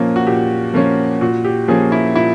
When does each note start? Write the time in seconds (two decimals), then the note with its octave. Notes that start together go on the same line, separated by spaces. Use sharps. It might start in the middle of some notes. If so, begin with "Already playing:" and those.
Already playing: A#2 F3 A#3 C#4
0.16 F#4
0.27 A#2 G4
0.74 F3 A#3 C#4
1.21 A#2 F#4
1.45 G4
1.68 F3 A#3 C#4 G#4
1.92 E4
2.15 A#2 E4